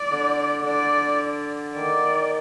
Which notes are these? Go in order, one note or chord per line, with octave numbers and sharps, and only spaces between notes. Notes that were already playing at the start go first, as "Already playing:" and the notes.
Already playing: D5
D3
D3 D5
D#3 D5